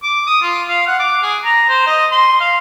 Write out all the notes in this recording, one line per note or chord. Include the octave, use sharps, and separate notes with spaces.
D6
D#6
F4
F5
F#5
D6
G#4
A#5
C5
D#5
C6
F5